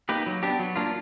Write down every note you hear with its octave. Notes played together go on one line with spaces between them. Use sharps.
A#3 D#4 G4 B4
F#3
B3 D4 G4
F#3
A#3 D4 F4